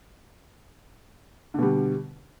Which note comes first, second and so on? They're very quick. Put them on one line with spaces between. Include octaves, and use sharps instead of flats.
D3 B2 G3